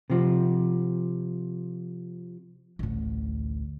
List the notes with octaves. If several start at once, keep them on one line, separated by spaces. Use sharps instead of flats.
C3 F3
A1 D2